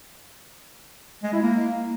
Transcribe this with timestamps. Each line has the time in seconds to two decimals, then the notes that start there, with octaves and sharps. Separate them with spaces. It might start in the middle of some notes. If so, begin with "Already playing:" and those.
1.23 G#3
1.33 E4
1.42 A#3